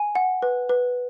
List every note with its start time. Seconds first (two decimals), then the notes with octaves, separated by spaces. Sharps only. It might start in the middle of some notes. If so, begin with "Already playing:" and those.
Already playing: G#5
0.15 F#5
0.42 B4
0.69 B4